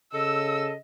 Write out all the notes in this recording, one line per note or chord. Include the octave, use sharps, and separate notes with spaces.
C#3 A4 D#5 E6